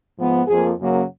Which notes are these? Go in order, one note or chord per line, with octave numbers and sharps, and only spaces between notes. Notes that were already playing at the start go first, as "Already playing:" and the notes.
G#2 F3 B3
F2 F3 A#3 G#4
F#2 C#3 F#3 A#3